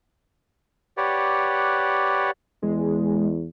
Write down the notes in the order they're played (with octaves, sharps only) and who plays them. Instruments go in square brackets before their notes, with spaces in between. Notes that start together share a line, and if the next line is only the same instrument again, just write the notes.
[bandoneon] G4 B4 C#5 D5 F#5
[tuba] E2 [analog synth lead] G#3